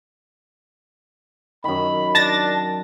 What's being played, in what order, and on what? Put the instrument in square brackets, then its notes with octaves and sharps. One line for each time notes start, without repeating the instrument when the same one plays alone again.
[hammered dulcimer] F#2 D#3 [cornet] B5
[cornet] D4 [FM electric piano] A5 A6 A#6